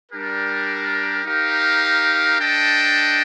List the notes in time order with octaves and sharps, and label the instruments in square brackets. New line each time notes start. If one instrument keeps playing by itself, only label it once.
[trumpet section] G3 D4 G4 A#4
D#4 G4 A#4 F5
D4 A4 D#5 G5